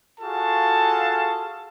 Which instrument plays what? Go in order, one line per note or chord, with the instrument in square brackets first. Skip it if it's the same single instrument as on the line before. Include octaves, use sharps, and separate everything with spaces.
[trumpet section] F4 F#4 G#4 A4 F5 A5